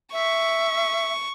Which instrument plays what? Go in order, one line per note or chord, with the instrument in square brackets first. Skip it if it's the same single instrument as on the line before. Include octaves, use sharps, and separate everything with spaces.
[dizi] E5 [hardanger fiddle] C#6